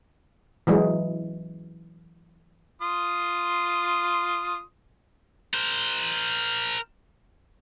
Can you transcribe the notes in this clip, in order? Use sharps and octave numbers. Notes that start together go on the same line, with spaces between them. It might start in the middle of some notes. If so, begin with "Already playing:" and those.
E3 F#3 G#3
F4 C6 D#6
A#4 C5